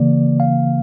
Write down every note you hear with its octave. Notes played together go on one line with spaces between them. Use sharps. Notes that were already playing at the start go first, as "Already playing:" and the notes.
Already playing: C#3 E3 A#3 D5
F5